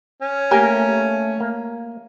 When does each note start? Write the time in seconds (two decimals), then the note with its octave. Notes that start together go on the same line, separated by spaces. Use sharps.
0.22 C#4
0.51 A3 A#3 G4 A#4 G#5
1.40 A#3